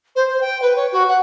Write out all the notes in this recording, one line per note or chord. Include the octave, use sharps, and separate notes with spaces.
C5
C5
G5
B4
C#5
F#4
F#5